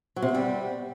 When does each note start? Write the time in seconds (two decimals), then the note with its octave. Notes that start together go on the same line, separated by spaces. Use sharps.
0.16 F#3
0.22 C3
0.28 B3
0.35 G3